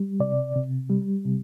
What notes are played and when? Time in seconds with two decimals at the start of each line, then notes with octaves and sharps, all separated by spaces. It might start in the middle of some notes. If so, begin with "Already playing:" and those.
Already playing: G3
0.20 C3 D5
0.56 C3
0.90 G3
1.25 C3